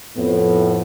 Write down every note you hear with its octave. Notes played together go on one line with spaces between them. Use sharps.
F2 A2 B3